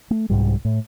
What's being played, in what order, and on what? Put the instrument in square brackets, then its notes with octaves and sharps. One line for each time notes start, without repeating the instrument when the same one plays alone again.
[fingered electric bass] A3
C2 G#2 G3
A2